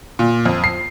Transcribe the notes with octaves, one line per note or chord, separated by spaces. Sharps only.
A#2
F2
C7